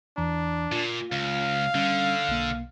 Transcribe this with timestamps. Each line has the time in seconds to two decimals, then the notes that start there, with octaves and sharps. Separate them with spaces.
0.17 E2 E3 D4 A#5
0.72 A#2 F4
1.12 C#2 F5
1.75 D3 G3 C#4
2.28 B1 B2 A#3